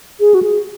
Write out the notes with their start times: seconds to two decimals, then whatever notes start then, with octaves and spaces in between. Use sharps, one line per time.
0.20 G#4
0.34 F#4
0.43 G#4